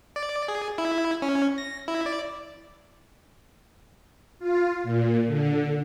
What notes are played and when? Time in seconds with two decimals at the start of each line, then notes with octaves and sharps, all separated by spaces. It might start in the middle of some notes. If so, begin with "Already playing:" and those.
0.16 D5
0.48 G#4
0.78 E4
1.22 C#4
1.58 A#6
1.88 E4
2.06 D5
4.39 F4
4.83 A#2
5.27 D3